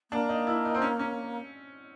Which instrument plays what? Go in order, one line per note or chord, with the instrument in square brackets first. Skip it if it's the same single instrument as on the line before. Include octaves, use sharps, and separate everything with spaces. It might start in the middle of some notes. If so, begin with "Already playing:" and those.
[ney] A#3 [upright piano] D4
[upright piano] D#4
E4
D#4
C4
C#4
C#4